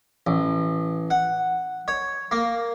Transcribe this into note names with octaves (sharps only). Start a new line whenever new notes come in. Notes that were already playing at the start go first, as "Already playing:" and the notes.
A1
F#5
C#5
A#3